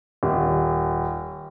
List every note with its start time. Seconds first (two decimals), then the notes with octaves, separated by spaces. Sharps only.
0.23 D#1